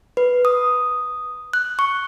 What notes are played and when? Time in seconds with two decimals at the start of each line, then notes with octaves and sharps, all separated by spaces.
0.17 B4
0.45 D#6
1.53 F#6
1.79 C#6